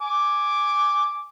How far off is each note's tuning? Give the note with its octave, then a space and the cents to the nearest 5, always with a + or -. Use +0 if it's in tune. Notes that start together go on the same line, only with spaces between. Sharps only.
G#5 +0 D6 +0